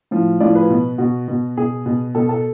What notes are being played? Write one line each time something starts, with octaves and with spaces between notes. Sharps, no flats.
A2 F3
A2 F3 D5
B4
B2
B2 F#4
B2
B2 G#4
B2
B2 A4
A4